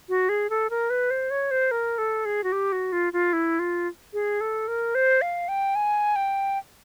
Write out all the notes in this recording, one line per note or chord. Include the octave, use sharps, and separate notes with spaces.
F#4
G#4
A4
A#4
B4
C5
C#5
C5
A#4
A4
G#4
F#4
G4
F#4
F4
F4
E4
F4
G#4
A4
A#4
C5
F5
G5
G#5
G5